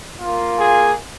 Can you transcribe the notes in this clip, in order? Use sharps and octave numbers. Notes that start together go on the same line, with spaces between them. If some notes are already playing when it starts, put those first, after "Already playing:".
A#3 F4
G#4